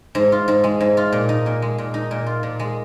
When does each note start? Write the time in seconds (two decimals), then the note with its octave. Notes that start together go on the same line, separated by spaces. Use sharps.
0.15 G#2
0.32 F4
0.48 G#2
0.64 G#3
0.80 G#2
0.97 F4
1.12 A#2
1.29 D#4
1.46 A#2
1.62 G#3
1.78 A#2
1.94 D#4
2.11 A#2
2.26 F4
2.43 A#2
2.60 G#3